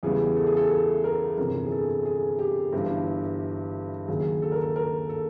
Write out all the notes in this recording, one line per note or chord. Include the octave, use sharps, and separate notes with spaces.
E2 C#3 E3 G3 B3 G#4
A4
G#4
A4
A4
A#4
G1 F2 C3 E3 A#4
G#4
A4
G#4
G4
G1 G2 E3
D#2 C#3 F#3 A#3 G#4
A4
A#4
A4
A#4
A4